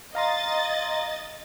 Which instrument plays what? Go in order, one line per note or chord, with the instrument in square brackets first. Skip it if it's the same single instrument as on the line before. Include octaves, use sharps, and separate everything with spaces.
[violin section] D#5 A6 [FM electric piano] F5 A#5 C6